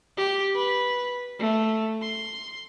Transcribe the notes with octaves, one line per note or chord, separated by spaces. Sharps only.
G4
B4
A3
C6